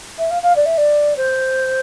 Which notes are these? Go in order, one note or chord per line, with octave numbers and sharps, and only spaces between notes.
E5
F5
F5
D5
E5
D5
C5